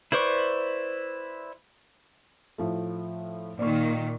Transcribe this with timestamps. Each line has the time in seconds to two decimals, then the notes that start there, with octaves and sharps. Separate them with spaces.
0.12 E4 B4 C5 D5 C#6
2.58 A2 F3 A3
3.59 A#2 D#3 D5 C#6